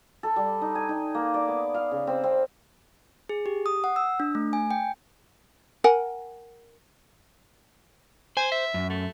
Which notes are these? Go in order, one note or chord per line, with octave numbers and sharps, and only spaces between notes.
A4
G3
D#4
G#5
D#4
A#3
D5
B3
F5
C#3
C4
C4
G#4
G4
D#6
F#5
E6
D4
A3
G#5
G5
A#4 F#5 G#5
C5 G#5
E5
F#2
A3